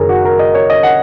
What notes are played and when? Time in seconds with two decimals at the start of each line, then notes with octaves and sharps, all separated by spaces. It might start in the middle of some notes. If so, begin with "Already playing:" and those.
Already playing: F#1 F#2 D#3 G#4 A#4 C#5
0.09 F#4
0.25 A#4
0.39 D#5
0.54 C#5
0.70 D#5
0.83 F#5